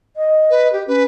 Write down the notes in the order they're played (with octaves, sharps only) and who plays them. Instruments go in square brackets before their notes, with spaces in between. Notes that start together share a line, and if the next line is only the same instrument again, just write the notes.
[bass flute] D#5
[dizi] B4
G4
[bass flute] C#4 [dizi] B4